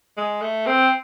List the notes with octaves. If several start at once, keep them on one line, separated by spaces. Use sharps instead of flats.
G#3
A3
C4